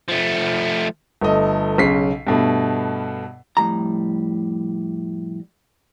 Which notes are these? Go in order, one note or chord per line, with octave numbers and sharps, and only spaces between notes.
F3 A3
G1 A3 D#5
B1 C#3 B6 C7
G2 B2 A3
F2 A2 G3 A#5